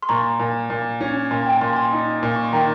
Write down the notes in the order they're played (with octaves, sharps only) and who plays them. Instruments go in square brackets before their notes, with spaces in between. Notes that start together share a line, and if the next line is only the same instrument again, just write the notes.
[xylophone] C6
[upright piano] A#2 [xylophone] A#5 C#6
[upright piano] A#2
A#2
C#4
[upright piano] A#2 [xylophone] G#5 C6
[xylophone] G5 A#5
[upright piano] A#2 [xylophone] G#5 C6
[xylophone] G#5 C6
[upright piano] D#4
A#2
[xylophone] C#6
C6
[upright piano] D#3 [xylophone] G5 A#5